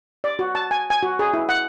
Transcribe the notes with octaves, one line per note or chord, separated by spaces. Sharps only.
D5
F#4
A5
G#5
G#5
F#4
G#4
E4
F#5